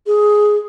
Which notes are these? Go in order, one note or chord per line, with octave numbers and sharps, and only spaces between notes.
G#4